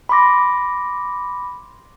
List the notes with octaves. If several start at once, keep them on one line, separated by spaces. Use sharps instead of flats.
B5 C6 D6 A#6